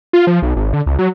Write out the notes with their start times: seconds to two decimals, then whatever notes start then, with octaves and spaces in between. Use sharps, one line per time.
0.13 F4
0.27 F3
0.42 B1
0.56 G#1
0.73 D3
0.86 C#2
0.99 F#3